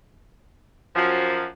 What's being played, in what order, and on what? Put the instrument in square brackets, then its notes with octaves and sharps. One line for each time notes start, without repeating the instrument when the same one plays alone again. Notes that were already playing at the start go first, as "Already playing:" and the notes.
[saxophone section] F#2 F3